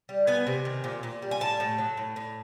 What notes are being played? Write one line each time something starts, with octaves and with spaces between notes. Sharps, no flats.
G3
B3 G#5
C3
D#3
A#2
A#2
G3
G#5
A2 A5
A2
F#3
A2
A2